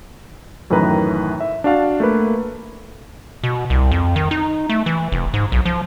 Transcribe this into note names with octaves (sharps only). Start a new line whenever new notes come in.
F#2 A2 D#3 E3 B4 A#5
E5
D4 F#4 F5 A5
A3 A#3 B4
B2
C2
F2
D#3
D#4
A3
E3
F1
G#2
B1
F3